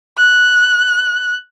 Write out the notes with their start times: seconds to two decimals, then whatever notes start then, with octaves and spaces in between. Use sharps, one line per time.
0.18 F#6